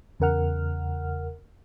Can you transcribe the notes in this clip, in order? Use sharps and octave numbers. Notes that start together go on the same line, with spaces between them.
E2 C#3 A#4 F#5 F6